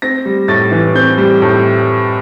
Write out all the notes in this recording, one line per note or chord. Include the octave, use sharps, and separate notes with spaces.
C4 A#6
G3
A2 A6
E3
C4 G6
G3
A2